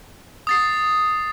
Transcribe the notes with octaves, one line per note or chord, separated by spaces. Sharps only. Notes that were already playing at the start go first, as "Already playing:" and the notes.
D#6 A6 C7